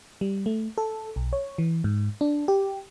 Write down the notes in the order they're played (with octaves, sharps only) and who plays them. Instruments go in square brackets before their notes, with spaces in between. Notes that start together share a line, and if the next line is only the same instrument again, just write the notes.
[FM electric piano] G3
A3
A4
B1
C#5
E3
G#2
D4
G4